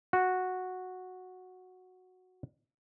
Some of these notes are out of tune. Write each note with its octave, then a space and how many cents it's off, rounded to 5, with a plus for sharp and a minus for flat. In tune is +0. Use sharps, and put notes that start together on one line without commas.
F#4 -5